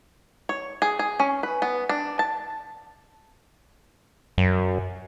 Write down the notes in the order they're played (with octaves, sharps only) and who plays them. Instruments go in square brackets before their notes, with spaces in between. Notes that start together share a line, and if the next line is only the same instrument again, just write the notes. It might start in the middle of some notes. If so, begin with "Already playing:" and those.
[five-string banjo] C#5
G#4
G#4
C#4
B4
B3
D4
A5
[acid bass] F#2